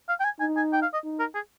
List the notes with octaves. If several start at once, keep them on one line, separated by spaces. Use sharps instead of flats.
F5
G5
G#5
D#4 G#5
G#5
G5
F5
D#5
D#4
A#4
G#4